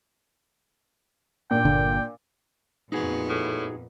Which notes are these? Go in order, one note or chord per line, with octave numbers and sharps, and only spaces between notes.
A#2 D4 G5
G1 D3
F2 A#2 B3 D#4 F#4 G#4
A2